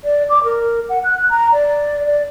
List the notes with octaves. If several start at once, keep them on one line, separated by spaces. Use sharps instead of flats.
D5
D6
A#4
F#5
F#6
A#5
D5
D5